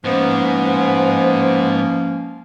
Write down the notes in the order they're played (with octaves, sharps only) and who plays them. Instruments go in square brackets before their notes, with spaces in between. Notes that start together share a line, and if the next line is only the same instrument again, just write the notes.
[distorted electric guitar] G#2 [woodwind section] F3 A#3 C#4 [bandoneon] B3 [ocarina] C5